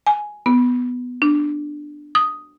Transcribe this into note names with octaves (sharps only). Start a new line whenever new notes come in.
G#5
B3
D4
D#6